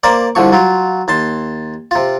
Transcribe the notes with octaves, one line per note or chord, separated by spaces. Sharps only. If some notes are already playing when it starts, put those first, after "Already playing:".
A#3 A#4 C5 D5
C2 D3 F3 C#6
F#3 F4
D#2 A5 C6
C3 F4